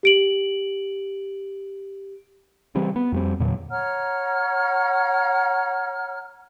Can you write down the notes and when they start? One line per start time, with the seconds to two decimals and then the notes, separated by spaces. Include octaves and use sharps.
0.03 G4 D7 F#7
2.75 C#3 E3 G3 C4
2.96 B3
3.12 F2 G3 C4
3.40 E2 A#2 D3 F#3
3.70 C#5 F#5 A#5 F6